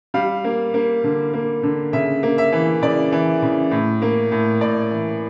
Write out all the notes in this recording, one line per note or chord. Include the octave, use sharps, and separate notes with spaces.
G3 F5
A#3
A#3
D3
A#3
D3
C#3 E5
A#3
E5
E3
C#3 D5
E3
C#3
A2
A#3
A2
A2 D5
E3